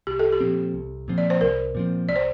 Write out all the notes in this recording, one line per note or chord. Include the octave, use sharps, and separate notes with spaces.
C2 G4
A4
G4
A#2 F3 C4
C2
A#2 F3 C4
D5
C5
C2 A#4
A#2 F3 C4
C2 D5
C5